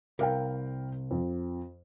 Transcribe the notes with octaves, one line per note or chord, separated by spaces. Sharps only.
C2 A#4 F5 G5
F2